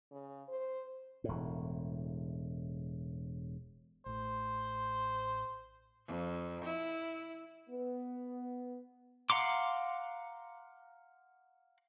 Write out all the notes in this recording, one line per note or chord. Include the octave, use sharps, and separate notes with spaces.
C#3
C5
E1 A2
A1 A2 C5
F2
E4
B3
F5 F#5 A#5 C6 D6